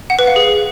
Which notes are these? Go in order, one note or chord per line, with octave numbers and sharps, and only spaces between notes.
F#5
B4
F5
G#4